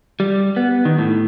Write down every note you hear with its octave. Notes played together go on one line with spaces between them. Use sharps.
G3
B3
D#3
A2